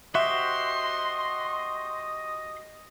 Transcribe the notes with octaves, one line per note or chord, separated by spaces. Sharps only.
F#4 G4 C5 D#5 E5 C6